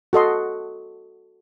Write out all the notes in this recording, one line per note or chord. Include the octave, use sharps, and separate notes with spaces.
F#4 A4 D#5 C6